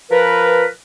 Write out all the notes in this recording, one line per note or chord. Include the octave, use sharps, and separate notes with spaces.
F3 A#4 B4